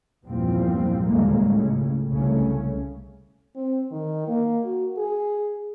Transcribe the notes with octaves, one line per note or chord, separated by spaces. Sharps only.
E2 G2 A#2 F3 G3 C4
D#2 A#2 D3 G3 G#3 A#3
C#2 A2 C#3
C2 C#3 A3 C#4
C4
D#3
A#3
F#4
G#4